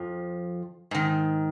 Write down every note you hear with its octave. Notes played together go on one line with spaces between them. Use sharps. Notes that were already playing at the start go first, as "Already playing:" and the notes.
Already playing: F2 F3
G#2 D#3